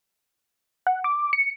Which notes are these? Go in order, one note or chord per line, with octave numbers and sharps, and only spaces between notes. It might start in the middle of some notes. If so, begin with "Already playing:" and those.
F#5
D6
C#7